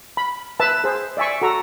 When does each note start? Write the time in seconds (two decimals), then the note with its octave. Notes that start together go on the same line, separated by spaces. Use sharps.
0.17 B5
0.60 B4 E5 A5
0.84 G#4 C5
1.17 D5 E5 G#5 C#6
1.42 F#4 A4 A#5